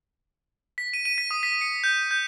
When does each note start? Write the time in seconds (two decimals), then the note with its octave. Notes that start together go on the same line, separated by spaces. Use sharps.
0.78 B6
0.94 D#7
1.05 D#7
1.18 B6
1.31 D#6
1.43 B6
1.61 C#7
1.84 G6
2.11 G6